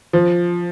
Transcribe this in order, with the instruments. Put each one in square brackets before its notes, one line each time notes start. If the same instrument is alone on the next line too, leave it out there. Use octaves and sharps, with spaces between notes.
[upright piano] F3